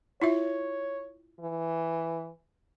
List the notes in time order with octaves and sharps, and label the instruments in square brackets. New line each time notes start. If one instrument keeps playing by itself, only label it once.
[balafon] E4 F4 E5 [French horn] C#5
[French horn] E3